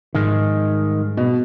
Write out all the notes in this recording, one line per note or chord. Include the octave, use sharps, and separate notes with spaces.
G#2 D#3 F3 G3 G#3
B2